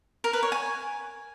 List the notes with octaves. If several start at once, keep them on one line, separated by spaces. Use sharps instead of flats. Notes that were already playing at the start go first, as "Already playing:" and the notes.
A#4
B4
C#5
G#5